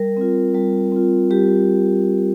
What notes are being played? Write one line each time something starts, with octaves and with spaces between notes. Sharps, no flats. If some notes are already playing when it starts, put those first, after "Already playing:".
Already playing: G3 A#4
C4 F4
G3
C4 F4
G3 G4